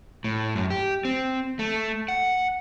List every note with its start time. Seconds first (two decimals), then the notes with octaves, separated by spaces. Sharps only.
0.24 A2
0.55 F#2
0.70 G4
1.05 C4
1.59 A3
2.08 F#5